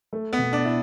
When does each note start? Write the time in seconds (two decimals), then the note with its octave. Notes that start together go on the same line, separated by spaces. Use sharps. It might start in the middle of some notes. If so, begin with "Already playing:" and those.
0.13 A3
0.33 B3
0.39 B2
0.53 D4
0.65 E4